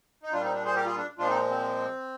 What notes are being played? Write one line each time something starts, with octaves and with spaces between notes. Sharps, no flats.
D#4
A#2 G3 D4 F4
C4 D#4
D4
G#4 C5
G4 A#4
F4 G#4
D4
A#2 F3 G#3 D4 F4
C4 D#4
C4